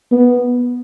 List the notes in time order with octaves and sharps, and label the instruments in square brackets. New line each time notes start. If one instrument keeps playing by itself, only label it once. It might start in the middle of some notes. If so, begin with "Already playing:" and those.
[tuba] B3